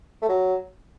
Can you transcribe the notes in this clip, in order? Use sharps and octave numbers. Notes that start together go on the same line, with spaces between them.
A3
F#3